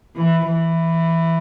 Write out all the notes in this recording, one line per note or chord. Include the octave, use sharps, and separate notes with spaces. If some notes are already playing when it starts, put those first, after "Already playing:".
E3
E3